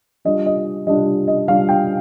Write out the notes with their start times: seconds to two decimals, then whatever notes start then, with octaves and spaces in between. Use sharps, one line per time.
0.25 G3 D4 F4 D#5
0.46 D#5
0.87 G3 D4 F4 D#5
1.28 D#5
1.48 G3 D4 F4 F5
1.69 G5